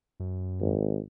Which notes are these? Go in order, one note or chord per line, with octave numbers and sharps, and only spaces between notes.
F#2
G#1